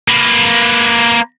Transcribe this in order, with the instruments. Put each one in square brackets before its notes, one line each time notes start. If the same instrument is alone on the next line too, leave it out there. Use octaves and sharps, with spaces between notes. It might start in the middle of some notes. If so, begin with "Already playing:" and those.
[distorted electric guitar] A#3 B4